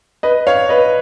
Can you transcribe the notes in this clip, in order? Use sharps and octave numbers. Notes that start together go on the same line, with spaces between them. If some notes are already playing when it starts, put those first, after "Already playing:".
B4 D#5
C#5 F5
B4 D#5